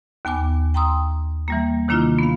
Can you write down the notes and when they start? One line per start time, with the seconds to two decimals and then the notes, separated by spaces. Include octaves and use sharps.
0.25 D#2 B3 G#5 D6
0.74 G5 A#5 C6 D#6 E6
1.48 E3 G3 A#3
1.88 C3 D#3 A#3 D4 E4 F4
2.19 B3 F5